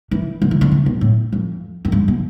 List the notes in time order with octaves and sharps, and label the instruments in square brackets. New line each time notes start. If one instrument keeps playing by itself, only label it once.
[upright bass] E3
D3
E3
D3
C3
B2
A2
F2
F2
G2
B2